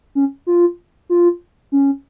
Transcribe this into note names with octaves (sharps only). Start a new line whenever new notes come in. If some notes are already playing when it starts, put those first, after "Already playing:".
C#4
F4
F4
C#4